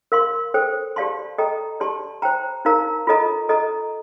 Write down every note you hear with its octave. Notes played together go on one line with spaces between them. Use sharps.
A#4 F5 C6
A4 C5 G5
G4 D5 F5 A5 C6
A4 D#5 G5 A#5
G4 D5 A5 C6
C5 G5 A#5
D#4 A#4 F5 A#5
F4 A4 D#5 A#5
A4 D#5 A#5